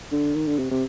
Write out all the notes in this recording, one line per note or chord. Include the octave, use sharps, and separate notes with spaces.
D3
D#3
D3
C3
C3